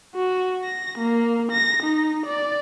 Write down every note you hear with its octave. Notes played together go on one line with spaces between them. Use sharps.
F#4
A#6
A#3
A#6
D#4
D5